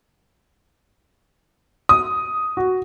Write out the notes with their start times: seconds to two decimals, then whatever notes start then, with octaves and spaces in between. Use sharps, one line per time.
1.89 D#6
2.57 F#4